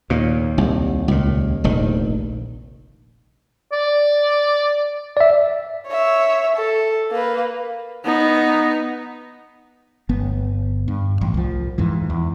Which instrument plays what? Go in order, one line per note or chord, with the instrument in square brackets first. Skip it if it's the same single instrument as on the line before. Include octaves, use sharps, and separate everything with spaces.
[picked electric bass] D#2 [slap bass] A#2
[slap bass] C2
C#2 A#2
F1 A#1 D#3
[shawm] D5
[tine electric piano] D5 E5
[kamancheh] C#5 E5
A4
A#3 B4
[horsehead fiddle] B3 D#4
[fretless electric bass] G1 B3
G2
A1
C2 F3
F2 G#2 E3
E2